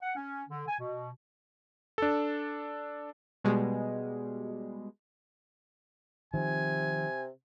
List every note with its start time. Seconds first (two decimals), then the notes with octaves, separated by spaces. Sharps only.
0.01 F#5
0.15 C#4
0.49 D3
0.67 G#5
0.79 B2
1.98 D4 A4
3.44 B2 G3 G#3
6.34 C3 D#3 F3 C4 G#5